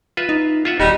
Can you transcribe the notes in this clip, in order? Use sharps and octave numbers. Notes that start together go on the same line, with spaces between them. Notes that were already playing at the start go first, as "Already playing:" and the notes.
F4 B4 E5
D#4
F4 E5 F#5
D#1 G3 D#4 F#4